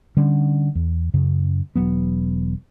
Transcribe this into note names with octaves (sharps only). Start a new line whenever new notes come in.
D3 G3 C#4
E2
F#2 C#3
E1 F#3 B3